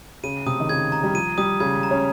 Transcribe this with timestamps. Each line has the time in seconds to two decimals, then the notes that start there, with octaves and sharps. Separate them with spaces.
0.24 C#3 D#7
0.46 C3 D#6
0.60 D#3
0.69 C#3 G#6
0.92 A#5
1.03 G3
1.15 F3 D#7
1.38 G3 D#6
1.60 C#3 G#6
1.83 A#5
1.91 C#4